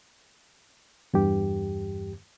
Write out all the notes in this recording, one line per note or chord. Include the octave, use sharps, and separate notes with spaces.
E2 G2 G4